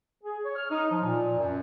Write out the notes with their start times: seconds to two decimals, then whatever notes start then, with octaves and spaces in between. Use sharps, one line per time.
0.23 G#4
0.44 C#5
0.56 F6
0.70 D#4
0.90 F3
1.03 A#2
1.37 F#2